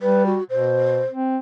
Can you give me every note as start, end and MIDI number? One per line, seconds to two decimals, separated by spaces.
0.01 0.37 55
0.01 0.26 71
0.26 0.44 66
0.50 1.01 47
0.50 1.07 72
1.10 1.38 60